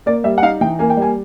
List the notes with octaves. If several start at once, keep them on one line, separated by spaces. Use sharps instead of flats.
A#3 D5
G3 E5
F#5
D#4 F5
E3 G5
A#3 G#5
G5
G3 G#5